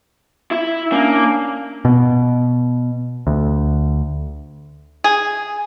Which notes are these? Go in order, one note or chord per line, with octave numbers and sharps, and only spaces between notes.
E4
A#3 C#4 D4
B2
D2
G#4